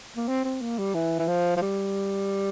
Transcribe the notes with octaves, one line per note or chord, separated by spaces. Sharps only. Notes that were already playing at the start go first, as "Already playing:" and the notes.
A#3
C4
C4
A#3
G3
E3
E3
F3
F3
G3